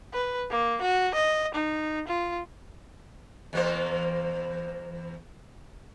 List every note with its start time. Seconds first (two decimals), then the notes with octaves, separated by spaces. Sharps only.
0.13 B4
0.50 A#3
0.81 F#4
1.14 D#5
1.54 D#4
2.07 F4
3.53 E2 A#3 C5